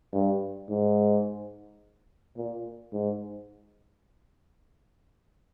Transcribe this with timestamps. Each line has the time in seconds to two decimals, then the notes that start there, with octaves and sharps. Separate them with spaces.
0.13 G2
0.70 G#2
2.37 A#2
2.93 G#2